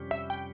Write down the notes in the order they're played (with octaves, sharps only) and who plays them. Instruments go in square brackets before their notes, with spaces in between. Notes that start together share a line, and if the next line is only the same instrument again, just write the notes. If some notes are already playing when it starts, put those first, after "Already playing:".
Already playing: [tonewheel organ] F2 C3 G3 C#4 G4
[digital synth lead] E5
G5